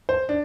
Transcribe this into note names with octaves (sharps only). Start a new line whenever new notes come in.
C5
D4